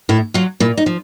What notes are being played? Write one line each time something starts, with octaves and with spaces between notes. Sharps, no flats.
A2 E4
F#3 F4
A#2 E4
D#4
F3